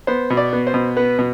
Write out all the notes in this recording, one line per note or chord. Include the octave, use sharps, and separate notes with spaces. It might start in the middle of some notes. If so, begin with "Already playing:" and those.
B3 C5
B2
D5
B3
C5
B2
B3 B4
B2